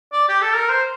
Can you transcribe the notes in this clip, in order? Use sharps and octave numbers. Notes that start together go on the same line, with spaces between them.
D5
G4
A4
A#4
C5